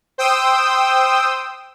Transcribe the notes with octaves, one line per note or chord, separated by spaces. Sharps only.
C5 G5 D#6 E6